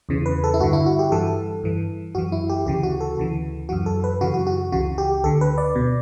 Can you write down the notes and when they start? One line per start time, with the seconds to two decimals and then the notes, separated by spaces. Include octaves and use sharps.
0.09 E2 C#3 E3
0.26 B4
0.44 A4
0.54 E4
0.60 G2 F#4
0.63 D3
0.73 E4
0.86 F#4
0.99 G4
1.12 G2 E3 A4
1.63 G2 E3
2.15 F#2 E3 F#4
2.32 E4
2.49 G4
2.66 D2 C#3 E3 G4
2.83 F#4
3.01 A4
3.18 D2 C#3 E3
3.69 F#2 E3 F#4
3.86 A4
4.04 B4
4.21 F#2 C#3 E3 F#4
4.34 F#4
4.47 F#4
4.72 C#2 C#3 E3 F#4
4.98 G4
5.24 D2 D3 A4
5.41 B4
5.58 D5
5.75 B2